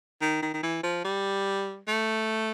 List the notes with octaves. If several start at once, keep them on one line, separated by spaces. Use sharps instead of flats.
D#3
D#3
D#3
E3
F3
G3
A3